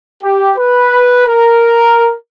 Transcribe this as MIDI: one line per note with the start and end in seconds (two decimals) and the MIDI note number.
0.23 0.52 67
0.57 1.23 71
1.27 2.14 70